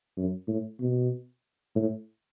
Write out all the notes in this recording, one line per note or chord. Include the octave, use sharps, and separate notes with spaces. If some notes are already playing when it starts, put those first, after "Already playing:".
F#2
A2
B2
A2